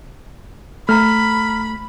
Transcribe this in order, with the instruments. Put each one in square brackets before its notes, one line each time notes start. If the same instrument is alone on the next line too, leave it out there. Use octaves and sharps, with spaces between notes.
[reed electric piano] A3 [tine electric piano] A#5 F6 [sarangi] B5